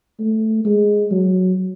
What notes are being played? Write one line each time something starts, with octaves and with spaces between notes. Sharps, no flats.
A3
G#3
F#3